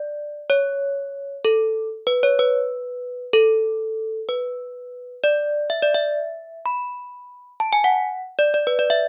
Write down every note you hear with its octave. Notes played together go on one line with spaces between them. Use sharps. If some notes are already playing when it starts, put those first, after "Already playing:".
Already playing: D5
C#5
A4
B4
C#5
B4
A4
B4
D5
E5
D5
E5
B5
A5
G#5
F#5
D5
D5
B4
D5
E5